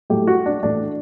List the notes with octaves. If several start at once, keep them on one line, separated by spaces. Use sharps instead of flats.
A2 F#3 A3 G4
F#4
D4
A2 E3 A3 D4